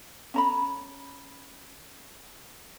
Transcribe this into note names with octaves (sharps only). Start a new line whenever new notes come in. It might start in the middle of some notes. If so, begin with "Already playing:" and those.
C#4 A#5 B5